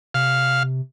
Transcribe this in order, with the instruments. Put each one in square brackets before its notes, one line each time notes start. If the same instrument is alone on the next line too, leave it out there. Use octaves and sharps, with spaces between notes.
[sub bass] C3 [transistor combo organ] F5